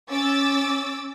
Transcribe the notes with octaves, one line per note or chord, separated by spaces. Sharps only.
C#4 D6 E6 A6